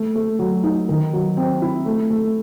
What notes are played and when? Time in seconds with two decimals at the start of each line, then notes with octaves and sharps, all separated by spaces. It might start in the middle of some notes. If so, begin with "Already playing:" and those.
Already playing: A3
0.15 A3
0.39 F#3
0.64 D#4
0.89 D#3
1.13 F#3
1.37 C4
1.62 E4
1.86 A3
2.10 A3